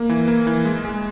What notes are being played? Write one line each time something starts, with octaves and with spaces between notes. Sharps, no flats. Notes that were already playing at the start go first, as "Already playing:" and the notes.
Already playing: A#3
E3
A#3
E3
G#3
G#3